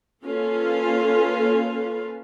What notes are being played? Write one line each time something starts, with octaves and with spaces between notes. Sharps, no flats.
A#3 C#4 F4 A4 B4 F5